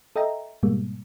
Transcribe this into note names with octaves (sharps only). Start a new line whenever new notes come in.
A4 D#5 E5 G5 A#5
G#2 B2 G3 G#3 A#3